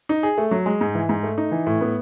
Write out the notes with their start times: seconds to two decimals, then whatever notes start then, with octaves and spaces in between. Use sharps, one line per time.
0.09 D#4
0.23 G#4
0.38 A3
0.51 F#3
0.66 G#3
0.81 G#2
0.95 E3
1.09 G#2
1.23 A3
1.38 D#4
1.52 E3
1.67 A2
1.81 B3